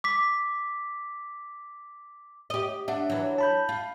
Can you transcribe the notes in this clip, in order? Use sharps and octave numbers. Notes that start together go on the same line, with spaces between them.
D6 B6
G4 D#5
D4 E5 F#5
E3 F#3
A5 B5 G6
F4